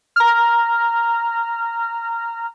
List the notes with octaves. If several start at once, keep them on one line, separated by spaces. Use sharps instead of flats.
A#5 F6